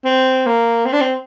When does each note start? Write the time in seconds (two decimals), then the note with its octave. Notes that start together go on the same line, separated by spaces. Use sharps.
0.05 C4
0.46 A#3
0.85 C4
0.93 D4
1.01 C4